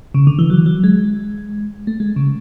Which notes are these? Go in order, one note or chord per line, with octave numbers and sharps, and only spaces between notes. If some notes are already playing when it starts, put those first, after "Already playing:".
C#3
D3
E3
F#3
F#3
G#3
A3
G#3
C#3